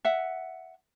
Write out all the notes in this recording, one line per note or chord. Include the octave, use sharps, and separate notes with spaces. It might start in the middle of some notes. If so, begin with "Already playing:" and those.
E5 F#5